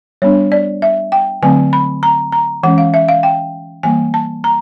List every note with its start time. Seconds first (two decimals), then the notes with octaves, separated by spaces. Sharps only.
0.22 G3 B3 D4 C#5
0.52 D5
0.82 E5
1.12 G5
1.42 D3 F#3 A3 C4 G#5
1.73 B5
2.03 A#5
2.32 A#5
2.63 E3 G#3 C#4 F#5
2.78 F5
2.94 E5
3.09 F5
3.23 G5
3.83 E3 G3 A#3 G#5
4.14 A5
4.44 A#5